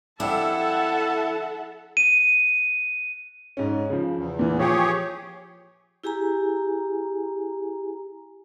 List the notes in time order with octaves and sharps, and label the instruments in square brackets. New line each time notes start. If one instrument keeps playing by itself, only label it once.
[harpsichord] F2 G3 D4 [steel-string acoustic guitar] E4 [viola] A4 E5 [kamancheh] F#5 A5
[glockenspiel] D#7
[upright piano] G#2 C#4
C#3 F3
[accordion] E2
[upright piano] A#2 E3
[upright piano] F3 [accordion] G4 G#4 C#5
[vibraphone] E4 G4 G#4 G#5 A#5